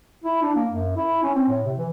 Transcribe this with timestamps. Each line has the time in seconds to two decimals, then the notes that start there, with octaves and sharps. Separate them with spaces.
0.24 E4
0.42 D4
0.55 A#3
0.71 F#2
0.96 E4
1.23 C#4
1.35 C4
1.48 A2
1.65 C3
1.78 E3